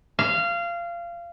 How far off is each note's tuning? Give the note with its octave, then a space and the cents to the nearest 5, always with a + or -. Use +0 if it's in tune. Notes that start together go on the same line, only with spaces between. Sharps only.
F5 -20